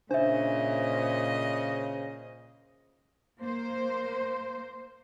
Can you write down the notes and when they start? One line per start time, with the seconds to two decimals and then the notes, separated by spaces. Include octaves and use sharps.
0.11 A#2 C#3 D4 C5 D#5 E5
3.39 A#3 C5